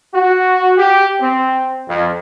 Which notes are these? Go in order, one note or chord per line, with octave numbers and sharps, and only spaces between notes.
F#4
G4
C4
F2